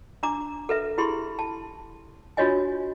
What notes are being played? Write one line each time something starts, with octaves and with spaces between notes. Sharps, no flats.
D4 A#5 D6
A4 B4 E5
E4 G4 G#4 B5 C6
A5
D4 F4 F#4 C#5 D#5 G#5